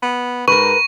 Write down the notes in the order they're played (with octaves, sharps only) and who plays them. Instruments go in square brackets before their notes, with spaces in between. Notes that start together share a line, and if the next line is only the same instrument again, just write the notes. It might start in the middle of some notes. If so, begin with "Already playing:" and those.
[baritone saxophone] B3
[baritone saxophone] G#2 [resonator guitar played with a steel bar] A#4 B4 [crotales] C#6